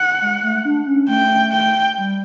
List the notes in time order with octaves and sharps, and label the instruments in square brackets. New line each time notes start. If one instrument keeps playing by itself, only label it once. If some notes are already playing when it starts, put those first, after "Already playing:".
Already playing: [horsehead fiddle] F#5
[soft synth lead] G#3
A3
D4
C#4
[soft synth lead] A3 [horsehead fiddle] G5
[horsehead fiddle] G5
[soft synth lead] G3